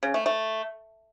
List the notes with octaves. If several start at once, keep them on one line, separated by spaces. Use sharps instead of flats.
C#3
A3
A3